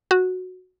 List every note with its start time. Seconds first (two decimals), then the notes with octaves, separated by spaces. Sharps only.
0.11 F#4